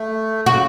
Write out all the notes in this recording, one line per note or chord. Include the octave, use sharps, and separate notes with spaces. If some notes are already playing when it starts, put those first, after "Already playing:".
Already playing: A3
C#3 F#4